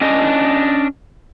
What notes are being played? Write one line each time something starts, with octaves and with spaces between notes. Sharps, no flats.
C#4 D4 D#5